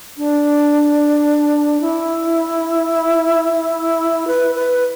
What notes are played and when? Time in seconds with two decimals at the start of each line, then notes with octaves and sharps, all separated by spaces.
0.18 D4
1.81 E4
4.27 B4
4.55 B4